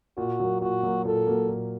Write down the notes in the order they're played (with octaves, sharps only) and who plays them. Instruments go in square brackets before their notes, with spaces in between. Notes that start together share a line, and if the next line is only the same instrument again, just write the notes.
[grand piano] A#2 [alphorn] F#4
[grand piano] F#3 A#3
[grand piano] A#2 [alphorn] F#4
[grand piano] F#3 A#3
[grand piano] A#2 [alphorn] A4
[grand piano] F#3 A#3
A#2